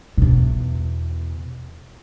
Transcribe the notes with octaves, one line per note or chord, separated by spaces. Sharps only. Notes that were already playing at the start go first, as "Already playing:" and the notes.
E2 B2